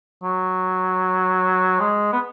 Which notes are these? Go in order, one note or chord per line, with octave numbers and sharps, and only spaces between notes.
F#3
G#3
B3